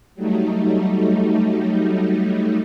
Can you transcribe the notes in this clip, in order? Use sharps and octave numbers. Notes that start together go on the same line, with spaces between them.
F#3 G3 A3 D#4